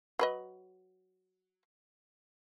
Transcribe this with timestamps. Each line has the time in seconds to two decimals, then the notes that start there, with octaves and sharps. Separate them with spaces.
0.19 F#3 B4 D#5